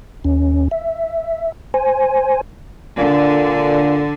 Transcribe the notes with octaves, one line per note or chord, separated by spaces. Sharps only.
D#2 C#4
E5
C5 G#5
A#2 D3